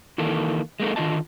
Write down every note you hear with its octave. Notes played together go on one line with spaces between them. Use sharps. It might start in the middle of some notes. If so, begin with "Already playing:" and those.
D#3 E3 A#3 A4
G#3 A#3 D#4 A4
D3 D#3 B3 F4 D#5 A5